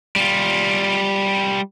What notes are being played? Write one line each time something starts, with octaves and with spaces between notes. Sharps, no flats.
G3 F4